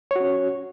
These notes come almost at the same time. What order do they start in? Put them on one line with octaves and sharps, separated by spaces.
C#5 F#4 C#4